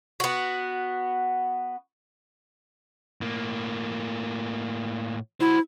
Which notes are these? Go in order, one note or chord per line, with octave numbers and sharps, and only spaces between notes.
B3 F#4
A2 A#3
E4 F#4 C5